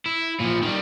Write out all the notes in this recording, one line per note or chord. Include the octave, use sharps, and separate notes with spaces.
E4
A#2 F3
D#3 G3